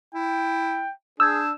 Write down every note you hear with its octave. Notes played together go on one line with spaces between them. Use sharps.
E4 G5
D4 G#4 D#6 E6 G6 G#6